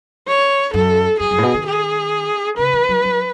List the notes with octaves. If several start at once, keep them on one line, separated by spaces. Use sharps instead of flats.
C#5
F#2 A4
F#2 G#4
F#2
A2
B2
D#3
G#4
C#3 B4
E3
F#3
F#3